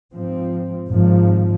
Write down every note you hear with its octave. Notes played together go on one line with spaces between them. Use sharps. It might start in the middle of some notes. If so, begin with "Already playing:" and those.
G#2 F3 C4
G#1 G#2 F3